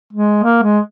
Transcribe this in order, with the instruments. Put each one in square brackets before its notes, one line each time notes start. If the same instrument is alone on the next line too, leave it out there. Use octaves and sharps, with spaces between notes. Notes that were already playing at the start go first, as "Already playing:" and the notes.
[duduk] G#3
A#3
G#3